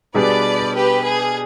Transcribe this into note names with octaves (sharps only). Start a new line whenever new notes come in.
B2 G3 B3 D4 G#4 B4 D5
G4 B4
G#4